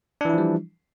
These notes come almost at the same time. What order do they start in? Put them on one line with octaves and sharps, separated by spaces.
D4 E3 E4 F3 G3